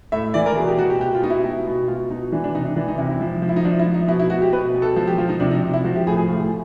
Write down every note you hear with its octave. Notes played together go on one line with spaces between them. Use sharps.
A2 E5
E3 D5
A#4
B2 G#4
G4
B2 F#4
G4
B2 G4
F4
B2 D#4
E4
B2
B2
B2 F4
B2 D#4
E3 D4
D4
C3 D#4
D4
E3 D4
D#4
C3 E4
E4
F3
F3
E4
D#4
F3 D4
E4
F3
D#4
B2 E4
E4
B2 F#4
G4
B2 B4
B2
A4
F3 A4
G4
F3 F4
D#4
C3 D4
D#4
C3
E4
F3 F#4
G4
A2 G#4
G#4
A2 F4